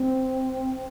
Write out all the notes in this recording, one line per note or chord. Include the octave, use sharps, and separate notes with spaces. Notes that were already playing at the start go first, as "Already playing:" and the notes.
Already playing: C4